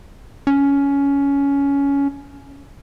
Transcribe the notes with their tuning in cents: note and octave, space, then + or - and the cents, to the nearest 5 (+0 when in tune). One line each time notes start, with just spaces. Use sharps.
C#4 +15